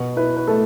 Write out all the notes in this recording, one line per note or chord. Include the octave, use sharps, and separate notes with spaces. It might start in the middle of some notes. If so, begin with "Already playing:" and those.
Already playing: B2
E4 B4
B4
A3 A4